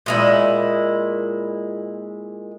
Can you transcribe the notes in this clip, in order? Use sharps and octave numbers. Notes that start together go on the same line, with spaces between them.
A#2 G#3 E4